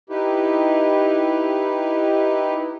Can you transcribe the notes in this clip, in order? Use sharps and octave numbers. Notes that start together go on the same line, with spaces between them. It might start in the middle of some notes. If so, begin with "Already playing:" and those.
D#4 E4 G4 B4